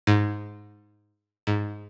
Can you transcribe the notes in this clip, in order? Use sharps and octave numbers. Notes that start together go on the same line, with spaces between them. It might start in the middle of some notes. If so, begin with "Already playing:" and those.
G#2
G#2